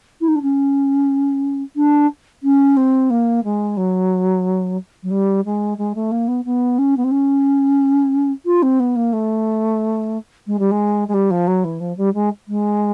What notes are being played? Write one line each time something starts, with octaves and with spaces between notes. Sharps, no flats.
E4
D#4
D4
C#4
D4
C#4
C4
A#3
G#3
F#3
F#3
G3
G#3
G#3
A3
A#3
B3
B3
C#4
B3
C4
C#4
F4
C4
B3
A#3
A3
G#3
G3
G#3
G#3
G3
F3
F#3
E3
F3
G3
G#3
G#3